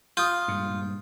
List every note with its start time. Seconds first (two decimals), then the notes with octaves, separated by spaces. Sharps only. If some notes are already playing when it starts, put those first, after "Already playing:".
0.17 F4 D#6 G6
0.48 G2 A#2 G#3